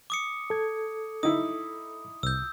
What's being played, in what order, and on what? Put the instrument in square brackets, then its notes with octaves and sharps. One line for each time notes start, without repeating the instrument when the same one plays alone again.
[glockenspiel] D6 D#6 C#7
[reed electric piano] A4 G#6
[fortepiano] D#4 E4 [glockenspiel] D#6
[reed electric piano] C2 [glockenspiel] E6 G6